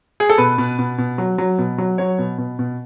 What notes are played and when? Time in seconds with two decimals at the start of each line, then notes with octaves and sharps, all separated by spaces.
0.20 G#4
0.30 A4
0.38 B2 B4
0.58 B2
0.79 B2
0.98 B2
1.18 F#3
1.38 F#3
1.58 B2
1.78 F#3
1.98 F#3 C#5
2.19 B2
2.38 B2
2.59 B2